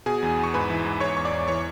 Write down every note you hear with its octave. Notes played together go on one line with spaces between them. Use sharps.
B2 G#4 G#5
E2
E2 C#6
G#2 B4 B5
E3
G#2
E2 C#5 C#6
E2 C#6
D5 D6
E2
E3 C#5 C#6